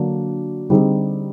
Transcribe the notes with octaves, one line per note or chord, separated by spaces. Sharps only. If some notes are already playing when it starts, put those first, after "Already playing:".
Already playing: D3 F#3 A#3 D4 F#4
D3 G3 C4 D#4 G#4